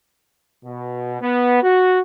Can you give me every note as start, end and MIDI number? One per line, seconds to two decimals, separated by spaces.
0.64 1.19 47
1.22 1.60 59
1.63 1.99 66